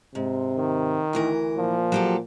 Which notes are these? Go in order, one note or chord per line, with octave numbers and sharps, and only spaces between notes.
G#2 C3
D#3
D2 E3 A#4
A#2 F3
F#3 G4 A4